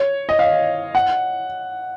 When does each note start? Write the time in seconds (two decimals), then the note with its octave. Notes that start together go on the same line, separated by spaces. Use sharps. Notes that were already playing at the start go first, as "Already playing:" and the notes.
Already playing: C#5
0.29 D#5
0.39 F5
0.95 F#5